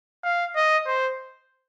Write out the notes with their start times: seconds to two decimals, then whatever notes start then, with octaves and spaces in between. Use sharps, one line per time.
0.24 F5
0.56 D#5
0.87 C5